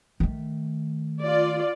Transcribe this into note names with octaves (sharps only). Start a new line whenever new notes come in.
D#3 A3
F4 D5